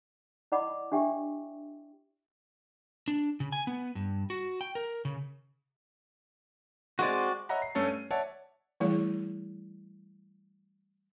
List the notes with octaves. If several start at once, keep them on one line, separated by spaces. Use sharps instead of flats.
E4 D5 D#5 F#5 B5 D6
D4 G4 E5 G5 C#6
D4
C#3
G#5
B3
G2
F#4
G5
A#4
C#3
G#3 C4 F#4 D5
C#5 D#5 E5 F#5 A#5 B5
C7
G2 A3 C#4 A4 C#5 A5
D#7
C#5 D5 E5 F#5 A5
E3 G3 A3 E4 G#4 C#5